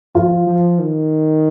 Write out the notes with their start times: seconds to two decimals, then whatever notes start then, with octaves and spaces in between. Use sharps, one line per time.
0.15 F3 F4
0.47 F3
0.79 D#3